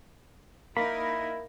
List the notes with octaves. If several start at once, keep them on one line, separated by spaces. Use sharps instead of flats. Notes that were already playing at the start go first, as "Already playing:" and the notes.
A#3 D#4 E4 A#4 B5